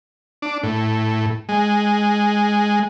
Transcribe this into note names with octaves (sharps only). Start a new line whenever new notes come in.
D4
A2
G#3